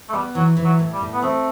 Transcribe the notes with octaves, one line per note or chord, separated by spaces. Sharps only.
A3
G3 B3
E3 F#3
E3
F#3
A2
G3
A2
B3
A3 C4